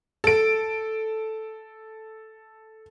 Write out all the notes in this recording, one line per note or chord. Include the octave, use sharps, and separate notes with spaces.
A4 D7